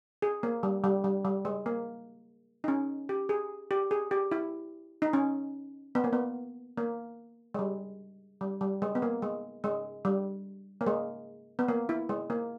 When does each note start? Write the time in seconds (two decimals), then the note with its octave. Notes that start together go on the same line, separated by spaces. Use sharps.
0.22 G#4
0.43 A#3
0.63 G3
0.84 G3
1.04 G3
1.25 G3
1.45 G#3
1.66 A#3
2.64 D#4
2.68 C#4
3.09 G4
3.29 G#4
3.71 G4
3.91 G#4
4.11 G4
4.32 E4
5.02 D#4
5.13 C#4
5.95 B3
6.04 A#3
6.13 B3
6.77 A#3
7.54 G#3
7.59 G3
8.41 G3
8.61 G3
8.82 G#3
8.95 B3
9.02 A#3
9.22 G#3
9.64 G#3
10.05 G3
10.81 A#3
10.87 G#3
11.59 B3
11.68 A#3
11.89 E4
12.09 G#3
12.30 A#3